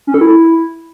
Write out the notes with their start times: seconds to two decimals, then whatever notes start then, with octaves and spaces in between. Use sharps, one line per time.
0.07 C#4
0.14 A4
0.21 E4